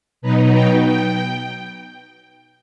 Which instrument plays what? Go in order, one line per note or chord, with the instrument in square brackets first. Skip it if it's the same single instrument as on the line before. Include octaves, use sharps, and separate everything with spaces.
[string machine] B2 F#3 B3 D#4
G5
G5